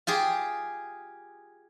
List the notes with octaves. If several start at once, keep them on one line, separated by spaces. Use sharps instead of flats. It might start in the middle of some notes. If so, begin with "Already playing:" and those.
F4 G4 G#4